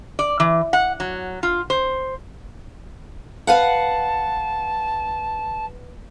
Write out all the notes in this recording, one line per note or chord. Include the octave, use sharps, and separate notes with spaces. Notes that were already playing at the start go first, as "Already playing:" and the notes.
D5
E3
F#5
F#3
F4
C5
B4 F5 F#5 A5